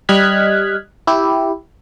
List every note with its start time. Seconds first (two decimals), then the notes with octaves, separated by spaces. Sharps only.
0.09 G3 D#5 F6 F#6 G#6 B6
1.07 E4 G4